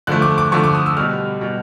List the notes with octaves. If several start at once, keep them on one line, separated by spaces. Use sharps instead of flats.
D3 F3 A3 F#6
D6
D6
D3 F3 A3 C#6
D6
D#6
E6
B2 G3 F6
B2 G3